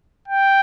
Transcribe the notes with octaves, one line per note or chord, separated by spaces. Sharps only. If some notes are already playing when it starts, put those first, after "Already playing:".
G5